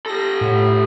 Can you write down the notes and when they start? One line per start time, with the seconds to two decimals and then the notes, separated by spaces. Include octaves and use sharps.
0.06 G4 A4 A#6
0.41 A2